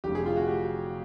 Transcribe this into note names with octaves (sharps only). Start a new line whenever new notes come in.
F1 F2 D3 F#3 A3 G4
G#4
F4
F#4
G4